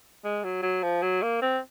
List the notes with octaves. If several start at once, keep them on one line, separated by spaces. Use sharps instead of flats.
G#3
F#3
F#3
F3
F#3
A#3
C4